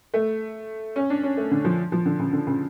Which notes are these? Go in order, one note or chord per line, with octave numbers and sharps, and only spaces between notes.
A3
C#4
D4
C#4
A3
D3
F3
F3
D3
C#3
D3
C#3